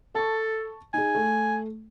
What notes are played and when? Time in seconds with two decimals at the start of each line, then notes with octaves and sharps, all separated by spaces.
0.15 A4 A5 C#6
0.94 D#4 G#4 G#5
1.15 A3